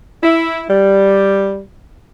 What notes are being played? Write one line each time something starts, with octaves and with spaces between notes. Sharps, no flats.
E4
G3